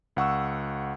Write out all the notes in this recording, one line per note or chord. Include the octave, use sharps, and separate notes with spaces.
C#2 F#5 C#6 E6